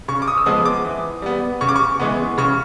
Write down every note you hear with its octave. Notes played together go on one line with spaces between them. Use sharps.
C#3 C#6
D6
D#6
E6
F3 G#3 B3 D#6
D6
E3
G3 B3
C#3 C#6
D6
C#6
E3 G#3 B3
C#3 C#6